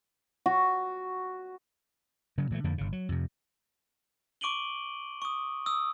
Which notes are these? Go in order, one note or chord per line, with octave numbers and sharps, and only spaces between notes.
F#4
C#3 F#3
A#2 E3 G#3 A3
F2 D3 F3 A#3
G1 C#3
F#3
F2 C3
C#6 D6 D7 D#7 F#7 G7
C#6 D#6
D#6 E6